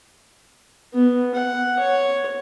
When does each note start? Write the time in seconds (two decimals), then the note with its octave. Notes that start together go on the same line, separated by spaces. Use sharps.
0.94 B3
1.35 F#5
1.79 C#5